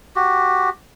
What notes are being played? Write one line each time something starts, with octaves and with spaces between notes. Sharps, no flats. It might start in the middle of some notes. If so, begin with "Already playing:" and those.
F#4 G4